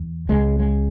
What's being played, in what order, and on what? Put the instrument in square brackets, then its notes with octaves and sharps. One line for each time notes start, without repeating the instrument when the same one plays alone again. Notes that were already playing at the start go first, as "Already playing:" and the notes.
Already playing: [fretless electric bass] E2
C#2 C#3 G#3
G#3